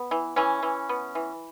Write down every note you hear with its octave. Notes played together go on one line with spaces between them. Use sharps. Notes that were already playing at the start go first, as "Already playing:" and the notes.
Already playing: B3
E3
E3 C#4
E3
B3
E3